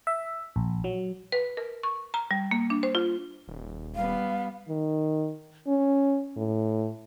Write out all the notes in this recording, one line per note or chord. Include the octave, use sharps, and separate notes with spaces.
E5
A#1
F#3
B4
A#4
C#6
A#5
G3
A#3
D4
C5
F4
D#1
G3 B3 F5
D#3
C#4
A2